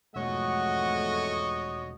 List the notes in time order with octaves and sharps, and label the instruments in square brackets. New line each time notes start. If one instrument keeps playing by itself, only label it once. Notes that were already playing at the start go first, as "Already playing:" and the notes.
[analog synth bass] E1 [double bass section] F2 G#2 A3 [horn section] F#4 C#5 D#5 [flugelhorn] F#5